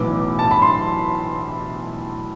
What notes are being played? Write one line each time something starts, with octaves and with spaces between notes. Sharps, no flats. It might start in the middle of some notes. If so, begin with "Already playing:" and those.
Already playing: B1 A2 E3 B3 D6
A5
B5
C6